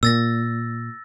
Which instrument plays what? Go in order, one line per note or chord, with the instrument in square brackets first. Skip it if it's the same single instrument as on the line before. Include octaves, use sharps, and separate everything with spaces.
[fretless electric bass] A#2 [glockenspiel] E6 A6 A#6